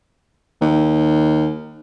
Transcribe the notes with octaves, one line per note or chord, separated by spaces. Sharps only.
D#2